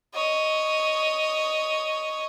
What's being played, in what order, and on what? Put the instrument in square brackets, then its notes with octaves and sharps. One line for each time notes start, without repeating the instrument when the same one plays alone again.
[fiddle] C#5 D#5